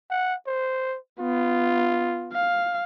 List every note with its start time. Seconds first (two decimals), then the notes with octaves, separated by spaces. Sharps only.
0.10 F#5
0.47 C5
1.20 B3 F4
2.32 F5